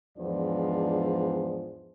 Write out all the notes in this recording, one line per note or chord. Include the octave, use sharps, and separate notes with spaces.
E2 G#2 F3 D4 C5 D5